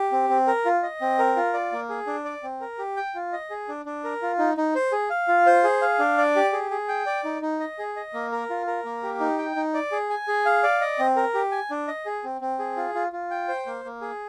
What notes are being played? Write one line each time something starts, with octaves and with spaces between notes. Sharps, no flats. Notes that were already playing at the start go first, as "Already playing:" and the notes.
Already playing: G4
C4
C4
A#4
F4
D#5
C4
A#4
F4
D5
A#3
G#4
D4
D5
C4
A#4
G4
G5
F4
D#5
G#4
D4
D4
A#4
F4
D#4
D#4
C5
G#4
F5
F4
C5
G#4
F5
D4
D5
G4
G#4
G#4
G5
D5
D#4
D#4
D#5
G#4
D#5
A#3
A#4
F4
A#4
A#3
G4
D#4
G5
D#4
D5
G#4
G#5
G#4
F5
D5
D#5
C4
A#4
G4
G#5
D4
D#5
G#4
C4
C4
G#4
F4
F4
F4
G5
C5
A#3
A#3
G#4